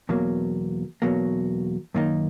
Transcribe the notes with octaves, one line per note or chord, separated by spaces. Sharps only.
E2 B2 F#3 A#3
E2 B2 F#3 A#3
F#2 D#3 A#3 D#4